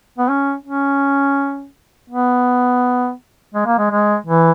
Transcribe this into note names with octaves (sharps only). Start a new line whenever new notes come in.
B3
C#4
C#4
B3
G#3
A#3
G#3
G#3
E3